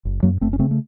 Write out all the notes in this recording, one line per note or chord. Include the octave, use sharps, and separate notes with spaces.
F#1
F#2 F#3 A#3
F#1 A3 C4
C#4
C#3 A3 C4
A3